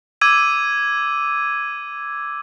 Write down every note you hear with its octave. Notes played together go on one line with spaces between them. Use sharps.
D6 E6 G#6 D#7